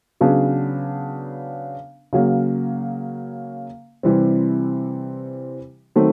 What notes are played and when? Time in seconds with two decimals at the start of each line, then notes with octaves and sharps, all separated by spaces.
0.21 C#3 F#3 B3 D4
2.13 C#3 F#3 A#3
4.03 C3 E3 G3 C4
5.96 D#3 F#3 A3 C4